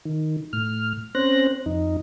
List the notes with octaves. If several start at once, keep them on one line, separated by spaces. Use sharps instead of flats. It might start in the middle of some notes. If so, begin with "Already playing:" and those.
D#3
A2 F6
C4 C#4 C5 F#6 A#6
F2 D#4